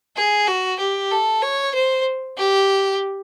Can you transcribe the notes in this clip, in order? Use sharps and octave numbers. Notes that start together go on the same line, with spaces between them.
G#4
F#4
G4
A4
C#5
C5
G4